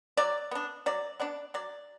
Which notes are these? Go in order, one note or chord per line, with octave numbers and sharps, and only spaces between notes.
F#3 D5
B3 D4
F#3 D5
B3 D4 D5
F#3 D5